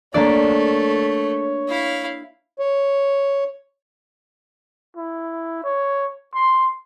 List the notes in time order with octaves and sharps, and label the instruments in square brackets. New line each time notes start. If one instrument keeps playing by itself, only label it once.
[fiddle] A3 [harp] A#3 D4 D5 [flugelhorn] C#5
[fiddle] E4 F5
[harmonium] C#5
[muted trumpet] E4
C#5
C6